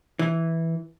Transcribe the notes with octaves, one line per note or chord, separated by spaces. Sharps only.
E3